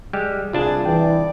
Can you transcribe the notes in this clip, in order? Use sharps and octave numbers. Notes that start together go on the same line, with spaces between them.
G3 G#3 G4
C2 D4 F4 G#4 A5
E3 D5 G5